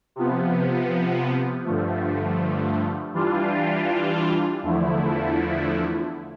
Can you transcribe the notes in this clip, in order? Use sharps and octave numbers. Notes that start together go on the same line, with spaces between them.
C3 F3 B3
G2 D3 F3 A3
E3 G3 D4 F4
E2 D3 F3 A3 E4